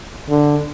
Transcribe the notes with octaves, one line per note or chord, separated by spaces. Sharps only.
D3